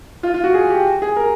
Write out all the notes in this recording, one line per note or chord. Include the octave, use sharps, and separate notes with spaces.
F4
F4
F#4
G#4
G4
G#4
A#4